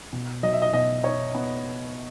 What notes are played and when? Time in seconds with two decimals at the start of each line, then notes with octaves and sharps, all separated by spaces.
0.13 B2
0.43 F#3 D#5
0.53 E5
0.62 D#5
0.73 B2 D#5
1.03 D#4 C#5
1.35 B3